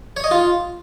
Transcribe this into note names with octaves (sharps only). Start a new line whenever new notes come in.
C#5
D#5
F4